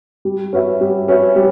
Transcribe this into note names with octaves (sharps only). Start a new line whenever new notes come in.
G3
C#4 F#4 B4 E5
G3
C#4 F#4 B4 E5
G3